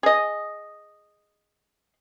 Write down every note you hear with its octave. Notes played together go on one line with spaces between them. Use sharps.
G#4 D#5